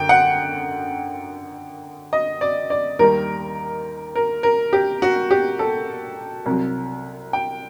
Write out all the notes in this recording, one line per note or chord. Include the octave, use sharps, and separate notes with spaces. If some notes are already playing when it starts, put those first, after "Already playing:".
Already playing: F#2 D3 G5
F#5
D#5
D5
D5
D#2 D#3 G3 A#4
A#4
A#4
G4
F#4
G4
A4
C2 C3 F#3
G5